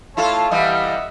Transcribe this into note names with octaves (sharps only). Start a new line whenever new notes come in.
E4 F4 A4 C#5 A5
E3 G3 D#5 E5 F#5